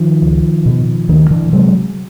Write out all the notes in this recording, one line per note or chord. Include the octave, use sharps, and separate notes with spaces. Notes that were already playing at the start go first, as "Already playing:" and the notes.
Already playing: D#3 F3
C#2
B2
D2 D#3
D3 E3
C3 F#3 G#3